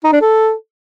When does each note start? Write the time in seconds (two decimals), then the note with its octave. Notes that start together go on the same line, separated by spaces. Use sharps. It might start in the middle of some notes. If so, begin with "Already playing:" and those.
0.04 D#4
0.13 D4
0.21 A4